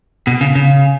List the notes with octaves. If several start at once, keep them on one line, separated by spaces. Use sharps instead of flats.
B2
C#3
C#3